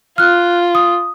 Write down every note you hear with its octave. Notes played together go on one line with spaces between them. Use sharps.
F4 F6 F#6
D#6